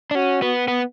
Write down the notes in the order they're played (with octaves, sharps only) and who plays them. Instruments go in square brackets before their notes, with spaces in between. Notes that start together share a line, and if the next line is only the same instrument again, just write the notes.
[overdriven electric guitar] D4
[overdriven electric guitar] C#4 [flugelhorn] F#4
[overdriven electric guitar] B3
B3